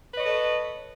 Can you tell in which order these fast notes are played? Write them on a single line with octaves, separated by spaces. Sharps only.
B4 D#5 C#5 A4